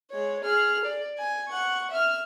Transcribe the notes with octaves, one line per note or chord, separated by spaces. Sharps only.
G#3 C#5
G#4 F6
D5
G#5
F#5 C#6
E5 F6